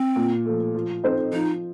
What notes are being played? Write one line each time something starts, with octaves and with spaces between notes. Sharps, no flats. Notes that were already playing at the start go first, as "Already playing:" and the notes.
Already playing: C4
A#2
F3 A3
F3
C4 D#4 A4 C5
F3 D#4